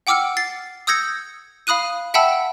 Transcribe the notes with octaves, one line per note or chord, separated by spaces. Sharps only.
F#5 G5 D6 E6 F6 C#7
A6 C7
D#6 E6 G6 G#6 A#6 C#7
F5 B5 D#6 F#6 D#7
E5 F#5 G5 A5 B5 E6